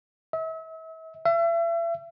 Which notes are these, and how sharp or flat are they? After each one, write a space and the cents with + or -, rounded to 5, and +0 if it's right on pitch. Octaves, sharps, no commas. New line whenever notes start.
E5 -40
E5 +35